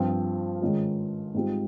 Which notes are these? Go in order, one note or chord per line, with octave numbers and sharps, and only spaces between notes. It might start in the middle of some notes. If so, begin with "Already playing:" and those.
Already playing: G2 F3 C4 F4
G#2 D#3 G#3 C#4 F4
G#2 G3 C4 F4